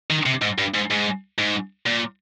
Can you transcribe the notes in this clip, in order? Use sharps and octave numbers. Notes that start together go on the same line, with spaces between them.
D#3
C3
G#2
G2
G#2
G#2
G#2
A#2